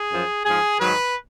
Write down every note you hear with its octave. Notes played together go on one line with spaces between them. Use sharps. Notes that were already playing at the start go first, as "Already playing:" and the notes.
Already playing: G#4
F#2 F3
G#2 F3 G#4
G#2 D#3 F#3 B4